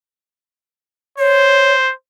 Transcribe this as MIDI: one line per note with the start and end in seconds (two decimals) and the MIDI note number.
1.18 1.92 72
1.18 1.73 73